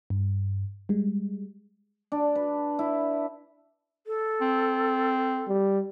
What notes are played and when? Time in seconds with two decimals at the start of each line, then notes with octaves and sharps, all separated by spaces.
0.10 G2
0.89 G3 G#3
2.12 D4
2.35 B4
2.79 E4
4.07 A4
4.41 C4
5.48 G3